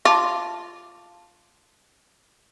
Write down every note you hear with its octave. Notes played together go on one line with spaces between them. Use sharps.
F4 A5 C6 D6